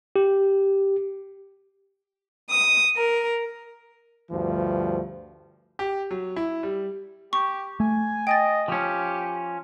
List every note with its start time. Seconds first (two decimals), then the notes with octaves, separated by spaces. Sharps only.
0.16 G4
2.51 D#6
2.97 A#4
4.31 D2 G2 F3
5.79 G4
6.11 F#3
6.36 E4
6.63 G3
7.33 G4 C#6
7.80 A3 G#5
8.27 D#5 G5 G#5 A6
8.68 F3 C#4 G4